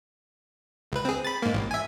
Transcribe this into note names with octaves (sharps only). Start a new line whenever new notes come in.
C#2 B4
C4 G#4
B5 A6
G#2 A#3
A1
E5 G#5